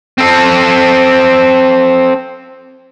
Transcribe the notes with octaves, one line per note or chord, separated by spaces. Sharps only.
C4 A4